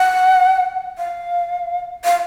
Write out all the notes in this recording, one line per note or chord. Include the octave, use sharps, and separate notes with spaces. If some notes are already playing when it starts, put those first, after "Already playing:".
Already playing: F#5
F5
F5